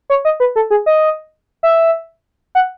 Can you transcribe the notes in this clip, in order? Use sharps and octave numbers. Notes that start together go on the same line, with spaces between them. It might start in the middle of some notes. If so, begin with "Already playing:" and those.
C#5
D#5
B4
A4
G#4
D#5
E5
F#5